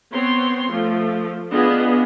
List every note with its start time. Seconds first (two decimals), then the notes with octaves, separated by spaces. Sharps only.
0.12 B3 C4 C#5 C6
0.69 F3 A3
1.52 B3 D4 F4 G#4 D#5